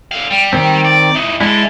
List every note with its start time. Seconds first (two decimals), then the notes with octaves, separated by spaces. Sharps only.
0.11 D3 F5
0.31 G3
0.53 D#3 C4
0.85 D5
1.15 E3 D#4
1.41 D3 G#3 E4 A4